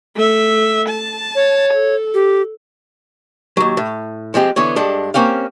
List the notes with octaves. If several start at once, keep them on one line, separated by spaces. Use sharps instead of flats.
A3 E5
A5
C#5
A4
G4
D#2 F#3
A2
F3 G#3 C4 G4
D3 E3 B3 C#5
G2 G#3 D4 A4
A#3 C4 C#4 G4 F5